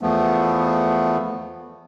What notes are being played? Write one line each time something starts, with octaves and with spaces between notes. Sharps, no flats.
E2 F3 A3 B3